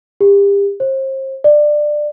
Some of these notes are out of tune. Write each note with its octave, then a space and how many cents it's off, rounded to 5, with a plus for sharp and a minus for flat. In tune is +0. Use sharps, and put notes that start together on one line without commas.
G4 +35
C5 +35
D5 +20